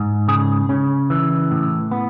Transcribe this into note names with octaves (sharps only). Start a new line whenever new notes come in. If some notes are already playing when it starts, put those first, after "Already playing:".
Already playing: G#2
C#3 G#4
C#3 C#4
E3
A2
B3